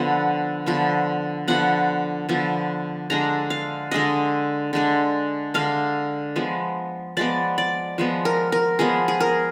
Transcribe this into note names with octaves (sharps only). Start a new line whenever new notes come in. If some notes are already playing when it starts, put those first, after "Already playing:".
Already playing: D3 F3 B3 F#5
D3 F3 B3
D3 F3 B3 F#5
D3 F3 B3
D3 G#3 D4 A#5
F5
D3 G#3 D4 D#5
D3 G#3 D4
D3 G#3 D4 F5
F3 G#3 B3
F3 G#3 B3 D5
D5
F3 G#3 B3
A#4
A#4
F3 G#3 B3 G#4
G#4
A#4